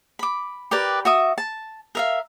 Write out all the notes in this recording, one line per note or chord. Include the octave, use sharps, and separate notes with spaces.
B5 D6
G4 A#4 B4 D5
F#4 E5 D#6
A5
A#4 E5 F5